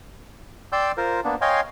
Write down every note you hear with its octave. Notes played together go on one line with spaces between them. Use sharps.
D5 G5 C6 E6 G6
F4 A#4 C5
A#3 B3 D4
C#5 D#5 F5 G5 G#5 C6